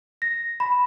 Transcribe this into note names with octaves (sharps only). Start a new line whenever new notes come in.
A#6
B5